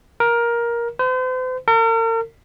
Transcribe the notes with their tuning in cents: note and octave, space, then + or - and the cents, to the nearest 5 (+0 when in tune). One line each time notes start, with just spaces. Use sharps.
A#4 +15
C5 -40
A#4 -40